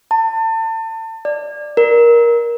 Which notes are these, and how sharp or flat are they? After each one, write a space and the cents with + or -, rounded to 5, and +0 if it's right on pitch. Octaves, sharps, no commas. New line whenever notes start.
A5 +30
D5 +10
A#4 +15